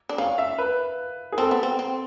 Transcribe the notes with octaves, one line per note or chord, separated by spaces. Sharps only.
D4
C#4 F5
E5
B4
G#4
C4 A4
B3
C4
C4